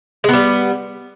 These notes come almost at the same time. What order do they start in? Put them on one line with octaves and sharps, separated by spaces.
G#3 B3 G3